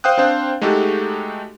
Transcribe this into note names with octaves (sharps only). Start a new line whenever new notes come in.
C5 F5 G5 D#6 F#6
C4 D4 C5 F5 G5
G#3 A3 D#4 F#4 G4 A4